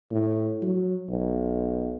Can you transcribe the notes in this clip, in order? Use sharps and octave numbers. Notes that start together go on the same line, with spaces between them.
A2
F#3
B1